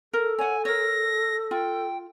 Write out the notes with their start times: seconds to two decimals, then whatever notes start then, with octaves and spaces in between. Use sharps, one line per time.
0.13 A4 A#4
0.38 C#5 F#5 G#5
0.65 A#4 C#5 A#6
1.51 F4 G5